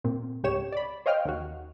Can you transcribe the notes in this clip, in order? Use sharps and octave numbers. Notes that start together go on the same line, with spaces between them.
A#2 C4
C#2 G#2 G4 C#5 E7
D5 B5
C5 C#5 D#5 F5 G5 F6
D#2 F#4